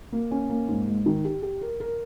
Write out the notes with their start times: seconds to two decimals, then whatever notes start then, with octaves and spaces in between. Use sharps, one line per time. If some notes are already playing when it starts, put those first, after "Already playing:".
0.12 A#3
0.31 C#4
0.49 A#3
0.68 G#2
0.87 G#3
1.06 D#3
1.25 G4
1.42 G4
1.61 A#4
1.80 A#4